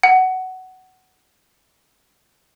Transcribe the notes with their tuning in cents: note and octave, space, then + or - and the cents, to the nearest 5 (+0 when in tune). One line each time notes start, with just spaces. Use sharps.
F#5 +15